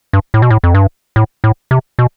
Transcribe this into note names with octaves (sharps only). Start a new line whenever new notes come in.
G2
A2
B2
A2
F2
G2
A2
A2
C3
B2